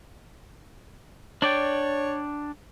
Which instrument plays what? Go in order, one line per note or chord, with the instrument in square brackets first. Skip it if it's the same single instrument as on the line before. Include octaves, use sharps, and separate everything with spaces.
[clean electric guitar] D4 D5 G5 [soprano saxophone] C#5